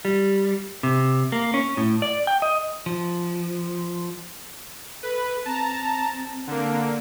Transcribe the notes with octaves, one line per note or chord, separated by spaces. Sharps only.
G3
C3
A#3
C#4
A2
D5
G5
D#5
F3
A4 B4
C4 A5 A#5
D3 A#3